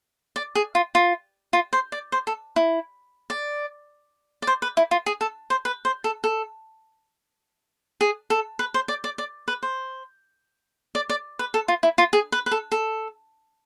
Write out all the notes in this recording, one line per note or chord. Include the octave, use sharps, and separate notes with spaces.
D5
G#4
F4
F4
F4
C5
D5
C5
A4
E4
D5
D5
C5
B4
E4
F4
G#4
A4
C5
B4
C5
A4
A4
G#4
A4
B4
C5
D5
D5
D5
B4
C5
D5
D5
B4
A4
F4
E4
F4
G#4
B4
B4
A4
A4